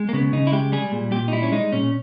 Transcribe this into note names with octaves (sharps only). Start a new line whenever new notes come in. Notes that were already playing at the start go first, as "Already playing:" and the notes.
Already playing: G#3
A#3
C#3 B3
C#3 D#4
E4
G#3 G4
G3 G#4
A#2
A#2 G4
D#4
G3 E4
C#4
G#3 D#4
A#2 C#4